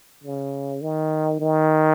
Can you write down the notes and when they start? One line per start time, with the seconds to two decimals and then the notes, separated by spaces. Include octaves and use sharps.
0.24 C#3
0.82 D#3
1.40 D#3